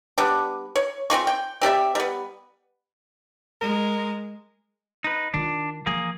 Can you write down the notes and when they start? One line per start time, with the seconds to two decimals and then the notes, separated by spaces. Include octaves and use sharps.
0.18 G3 B3 D4
0.76 C#5
1.10 C#3 C4 F4 C#6
1.27 G5
1.61 C4 G4 D5 E5
1.95 G3 B3
3.61 G#3 A#4
5.04 D#4 B4
5.34 D#3 D4 F4
5.86 E3 F3 A#3 G#4